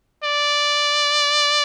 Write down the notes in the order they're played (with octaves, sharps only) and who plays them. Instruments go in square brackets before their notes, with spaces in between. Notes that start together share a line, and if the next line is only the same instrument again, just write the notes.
[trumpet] D5